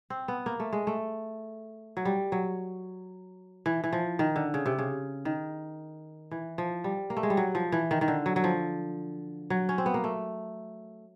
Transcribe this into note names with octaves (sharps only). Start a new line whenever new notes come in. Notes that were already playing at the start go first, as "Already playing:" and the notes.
C4
B3
A#3
A3
G#3
A3
F#3
G3
F#3
E3
E3
F3
D#3
D3
C#3
C3
C#3
D#3
E3
F3
G3
A#3
A3
G#3
G3
F#3
F3
E3
D#3
D#3
D3
F#3
F#3
F3
F#3
C#4
C4
B3
A#3
A3